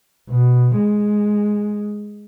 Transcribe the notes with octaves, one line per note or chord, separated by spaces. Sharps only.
B2
G#3